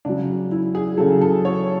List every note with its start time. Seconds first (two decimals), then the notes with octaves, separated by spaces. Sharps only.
0.05 C#3 F#3 D4
0.51 E4
0.75 G#4
0.98 C#3 F#3 A4
1.21 A4
1.45 C#5